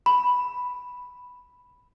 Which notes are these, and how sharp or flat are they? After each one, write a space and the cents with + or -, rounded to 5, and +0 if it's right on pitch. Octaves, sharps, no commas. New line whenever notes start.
B5 +0